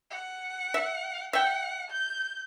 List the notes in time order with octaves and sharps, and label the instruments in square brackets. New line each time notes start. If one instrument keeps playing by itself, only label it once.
[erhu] F#5
[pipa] E5
[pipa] E5 G5 [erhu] F#5
[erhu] G6